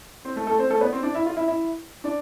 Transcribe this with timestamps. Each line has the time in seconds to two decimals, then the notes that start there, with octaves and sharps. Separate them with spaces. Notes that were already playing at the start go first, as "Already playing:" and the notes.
0.25 C4 C5
0.36 A3 A4
0.47 A3 A4
0.59 C4 C5
0.70 A3 A4
0.81 B3 B4
0.93 C4 C5
1.03 D4 D5
1.15 E4 E5
1.26 F4 F5
1.37 E4 E5
1.48 E4 E5
2.04 D4 D5